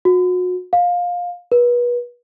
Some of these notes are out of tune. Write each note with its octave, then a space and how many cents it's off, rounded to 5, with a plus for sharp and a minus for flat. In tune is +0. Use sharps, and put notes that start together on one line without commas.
F#4 -35
F5 +20
B4 -30